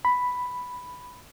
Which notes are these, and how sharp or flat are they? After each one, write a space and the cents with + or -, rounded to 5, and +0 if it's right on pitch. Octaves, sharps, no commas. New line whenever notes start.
B5 +5